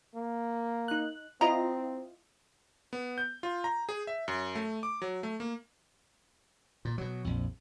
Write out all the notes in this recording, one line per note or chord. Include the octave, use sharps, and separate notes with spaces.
A#3
D#4 F#6
C4 E4 F4 D#5 A#5
B3
G6
F4
A#5
G#4
E5
F#2
A3
D6
F#3
A3
A#3
A#2
B2 F#3
A#1 F2